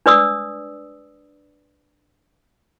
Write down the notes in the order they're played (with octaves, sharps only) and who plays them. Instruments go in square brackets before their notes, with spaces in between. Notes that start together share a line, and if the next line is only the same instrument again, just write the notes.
[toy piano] D4 B4 D5 D#6 E6